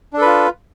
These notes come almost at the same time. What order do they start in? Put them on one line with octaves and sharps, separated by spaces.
D4 A4 B4 F4